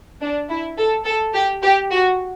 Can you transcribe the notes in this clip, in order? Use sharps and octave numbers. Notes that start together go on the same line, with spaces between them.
D4
E4
A4
A4
G4
G4
F#4